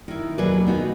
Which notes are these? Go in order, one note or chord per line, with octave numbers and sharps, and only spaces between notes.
D#3 E4
D#2 B2 F#3 G#4 B4 D5
B3 D#4 F#4